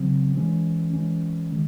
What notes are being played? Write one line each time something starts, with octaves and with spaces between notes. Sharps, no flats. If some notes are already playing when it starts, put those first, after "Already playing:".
Already playing: C#3 F#3 C4
E3 G#3 C#4
E3 G#3 C#4
D#3 G#3